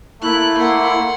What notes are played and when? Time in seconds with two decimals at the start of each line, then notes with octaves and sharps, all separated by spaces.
0.22 A3 A#3 E4 F#6
0.58 A#3 F#5 C6